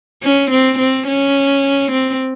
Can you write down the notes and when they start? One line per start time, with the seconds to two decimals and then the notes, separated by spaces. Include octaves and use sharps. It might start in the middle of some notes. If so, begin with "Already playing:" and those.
0.23 C#4
0.51 C4
0.79 C4
1.07 C#4
1.91 C4